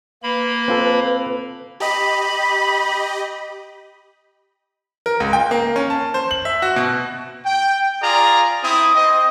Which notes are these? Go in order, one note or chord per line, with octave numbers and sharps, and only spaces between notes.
A#3 B4 B5
C4 F4 A4
G4 D#5 B5
A#4
C#2
G5
A#3
C#4
A5
C5
F#7
E5
F#4
B2
G5
F4 G#4 D5 A#5
C4 E4 D#6
C4 D#5